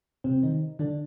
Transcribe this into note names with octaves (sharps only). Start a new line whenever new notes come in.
C3 C4
D#3 D#4
D3 D4